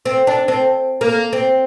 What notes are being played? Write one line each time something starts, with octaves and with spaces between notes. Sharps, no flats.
C4
D4
C4
A#3
C4